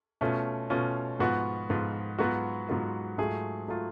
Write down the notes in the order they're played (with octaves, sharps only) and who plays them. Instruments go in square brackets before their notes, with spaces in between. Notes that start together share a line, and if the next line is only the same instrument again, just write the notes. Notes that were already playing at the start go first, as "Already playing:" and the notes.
[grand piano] B2 A3 C#4 F4
B2 A3 C#4 F4
G#2 F3 B3 F4 F#4
G#2 F3 B3 F4
G#2 F#3 B3 F4 F#4
G#2 F#3 B3 F4
G#2 F#3 A3 F4 G#4
F#3 A3 F4